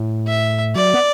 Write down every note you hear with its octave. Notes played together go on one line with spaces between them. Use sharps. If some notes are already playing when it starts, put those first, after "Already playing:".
Already playing: A2
E5
F#3 D5
B3